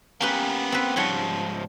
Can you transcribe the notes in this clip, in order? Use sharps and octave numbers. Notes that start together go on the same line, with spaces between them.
A#3 B3 C#4 G4 B4
C4 B4
G#2 F3 G3 C#5 F#5